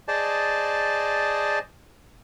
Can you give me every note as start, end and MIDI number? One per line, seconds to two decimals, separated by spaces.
0.08 1.59 68
0.08 1.59 72
0.08 1.59 74
0.08 1.59 75
0.08 1.59 81